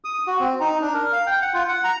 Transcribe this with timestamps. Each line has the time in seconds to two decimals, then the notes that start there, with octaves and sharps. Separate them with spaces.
0.04 D#6
0.27 F#4
0.40 C4
0.60 D#4
0.81 D4
0.94 A#4
1.12 F5
1.27 G5
1.42 F#5
1.54 F4
1.68 F#5
1.84 A#5